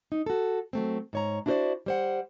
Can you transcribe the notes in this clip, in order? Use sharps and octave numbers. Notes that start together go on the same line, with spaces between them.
D#4
F#4 A4
F#3 A3 C4
G#2 C#5 A#5
D4 E4 F#4 A#4 C5 D5
G3 C5 F#5